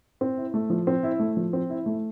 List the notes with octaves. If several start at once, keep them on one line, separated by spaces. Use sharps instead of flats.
C4
E4
A3
F3
C4
E4
A3
F3
C4
E4
A3